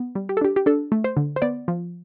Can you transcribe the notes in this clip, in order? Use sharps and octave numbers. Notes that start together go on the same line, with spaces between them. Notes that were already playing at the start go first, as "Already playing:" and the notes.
Already playing: B3
G3
G4
A4
D4 G4
G4
D4 A4
A3
C5
D3
C5
B3 D5
F3